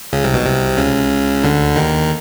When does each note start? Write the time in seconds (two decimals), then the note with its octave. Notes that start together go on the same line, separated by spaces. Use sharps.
0.13 C#2 C#3
0.24 C2 C3
0.34 B1 B2
0.46 C2 C3
0.78 C#2 C#3
1.44 D2 D3
1.76 D#2 D#3